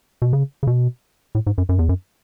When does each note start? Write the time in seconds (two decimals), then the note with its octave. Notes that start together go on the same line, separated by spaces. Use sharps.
0.22 B2
0.33 C#3
0.63 C#3
0.67 B2
1.35 A2
1.47 G#2
1.58 F#2
1.69 F#2
1.79 E2
1.89 F#2